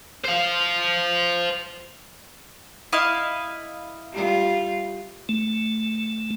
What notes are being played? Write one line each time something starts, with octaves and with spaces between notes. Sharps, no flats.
C5 F5
E4 D#5 F5
G3 F4
A3